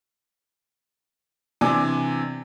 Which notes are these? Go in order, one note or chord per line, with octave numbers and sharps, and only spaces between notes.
C3 E3 D4 G#5 D6 G#6